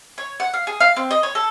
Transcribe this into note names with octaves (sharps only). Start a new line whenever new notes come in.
C#5
F#5
F5
G#4
F5
C4
D#5
C#5
A4